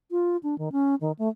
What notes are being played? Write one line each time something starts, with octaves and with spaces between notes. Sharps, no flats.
F4
D4
D#3
C#4
D#3
A3